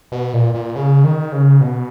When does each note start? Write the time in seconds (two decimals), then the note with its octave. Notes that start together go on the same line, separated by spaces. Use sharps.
0.12 B2
0.33 A#2
0.54 A#2
0.76 C#3
1.04 D#3
1.32 C#3
1.61 B2